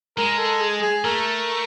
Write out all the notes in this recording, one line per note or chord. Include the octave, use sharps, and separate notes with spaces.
G#3 A#4
A4
G#4
G#4
A3 A#4